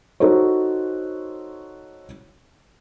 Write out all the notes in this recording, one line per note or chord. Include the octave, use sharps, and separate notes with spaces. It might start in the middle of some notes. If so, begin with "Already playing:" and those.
D#4 F#4 A4 C5 C#5